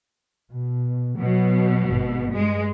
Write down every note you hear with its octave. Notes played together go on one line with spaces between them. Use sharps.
B2
B2 F#3
G#1
G2 G#3